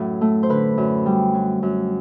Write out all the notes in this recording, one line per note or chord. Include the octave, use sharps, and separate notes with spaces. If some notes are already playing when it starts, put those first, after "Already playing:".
Already playing: F#2 A2 F#3
A3
C5
D3 B4
F#2
G3
F#3
F#2